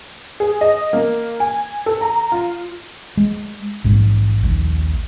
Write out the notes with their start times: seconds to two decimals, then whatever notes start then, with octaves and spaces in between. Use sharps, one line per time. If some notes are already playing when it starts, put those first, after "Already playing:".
0.40 G#4
0.61 D#5
0.93 A#3
1.40 G#5
1.86 A4
2.01 A#5
2.32 F4
3.17 G#3
3.84 A#1 G#2 G#3
4.43 A#1 D#2